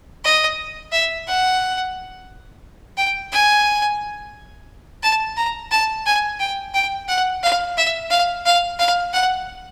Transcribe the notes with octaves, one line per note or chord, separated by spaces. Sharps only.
D#5
E5
F#5
G5
G#5
A5
A#5
A5
G#5
G5
G5
F#5
F5
E5
F5
F5
F5
F#5